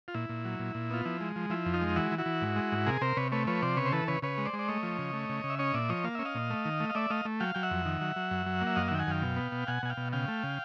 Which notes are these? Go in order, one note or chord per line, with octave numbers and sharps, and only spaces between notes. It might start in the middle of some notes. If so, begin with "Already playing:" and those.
F4
A#2 E4
A#2
F#3
A#2
A#2
B3 F4
F3 E4
G#3
F3
F3 E4
F2
D#4 F4
G#3
E3 E4 F#4
E3
E4 F#4
E3
G#2
G#3
G#2
C3 G#4 A#4
C3 A#4 C5
C3 B4 C#5
A3 B4 C#5
F3 B4 C#5
C3 C5 D5
C#3 B4 C#5
C5
E3 A4 B4
C#3 B4 C#5
C#3 B4 C#5
G#3
C5 D5
G#3
D5
A3 C#5 D#5
F3
C#3
A3
C#3
C#3
E5
C#4 C#5 D#5
A#2 D5 E5
F3 C#5 D#5
A#3 F5
C#4 E5
D#5 F5
A#2
A3
D#3
A3
F5
A3 D5 E5
A3 D#5 F5
A3
F#3 F5 G5
F#3 G5
E5 F#5
F2
D#3
F#3
F#3
F#2
F#3
A#3
E5
F#2 D#5 F5
D#3 E5 F#5 G5
F#5 G#5
F#2 F5 G5
B2
B3
B2
B2 F#5 G#5
B2 G#5
F5 G5
B2
C#3 F5 G5
A3
C#3